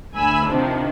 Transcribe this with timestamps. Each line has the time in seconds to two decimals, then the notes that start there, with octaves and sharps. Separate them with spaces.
0.16 D2 G#5 B5 E6
0.47 C3 D#3 F3 D4